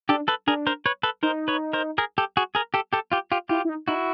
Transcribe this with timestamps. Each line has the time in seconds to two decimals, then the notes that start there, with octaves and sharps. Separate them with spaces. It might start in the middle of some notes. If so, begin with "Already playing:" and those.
0.09 D4 G4 A4
0.28 A4 B4
0.47 D4 G#4 A#4
0.67 A#4 C5
0.86 B4 C#5
1.03 A4 B4
1.23 D#4 A#4 C5
1.48 B4 C#5
1.73 A#4 C5
1.98 G#4 A#4
2.18 G4 A4
2.37 F#4 G#4
2.55 G#4 A#4
2.74 G4 A4
2.93 G4 A4
3.12 F4 G4
3.32 F4 G4
3.49 E4 F4 G4
3.65 E4
3.69 D#4
3.88 D#4 E4 F#4